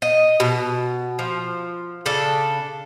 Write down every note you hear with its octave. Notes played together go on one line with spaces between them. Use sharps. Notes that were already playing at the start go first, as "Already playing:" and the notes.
D#5
B2
F3
C#3 D4 A4